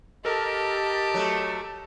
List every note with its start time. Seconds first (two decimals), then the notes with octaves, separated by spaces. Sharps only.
0.25 G4 A4 A#4 D#5 A5
1.14 F#3 A3